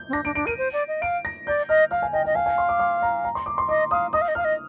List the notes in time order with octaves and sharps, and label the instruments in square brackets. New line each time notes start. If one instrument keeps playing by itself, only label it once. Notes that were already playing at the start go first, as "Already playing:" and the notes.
Already playing: [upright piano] G6
[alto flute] C4
[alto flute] D4 [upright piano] A#6
[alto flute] D4 [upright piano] D7
[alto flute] D4 [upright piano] D7
[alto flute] A#4 [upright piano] D#7
[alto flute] C5
D5
D#5
[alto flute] F5 [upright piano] D7
[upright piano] A#6
[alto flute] D5 [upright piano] G6
[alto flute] D#5 [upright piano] F6
[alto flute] F5 [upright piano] F6
[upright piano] G#5
[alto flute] D#5 [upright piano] G5
[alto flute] D#5 [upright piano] G5
[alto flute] F5 [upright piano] G#5
[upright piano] G#5
C6
D6
D6
A#5
A#5
C6
D6
C6
[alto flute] D#5 [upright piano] D6
[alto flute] F5 [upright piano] D#6
[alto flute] D#5 [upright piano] D#6
[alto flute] F5
D#5
[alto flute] F5 [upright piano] F6
[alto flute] D#5